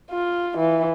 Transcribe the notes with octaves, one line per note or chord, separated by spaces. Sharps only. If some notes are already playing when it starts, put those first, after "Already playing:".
F4
E3